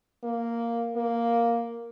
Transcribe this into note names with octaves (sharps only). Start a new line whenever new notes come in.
A#3
A#3